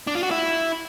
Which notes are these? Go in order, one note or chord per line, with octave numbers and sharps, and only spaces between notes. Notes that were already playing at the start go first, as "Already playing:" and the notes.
D4
F4
F#4
E4